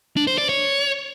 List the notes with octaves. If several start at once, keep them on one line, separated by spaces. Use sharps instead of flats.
D4
C5
D5
C#5